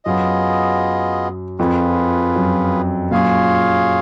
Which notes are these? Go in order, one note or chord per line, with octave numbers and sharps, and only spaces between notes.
F#2 B3 F4 G#4 D#5
F2 F4 G#4 B4
F#2
F#2 A#2 F4 G#4 C#5 F5